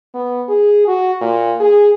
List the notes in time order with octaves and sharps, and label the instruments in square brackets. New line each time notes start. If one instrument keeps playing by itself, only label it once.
[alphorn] B3
G#4
F#4
A#2
G#4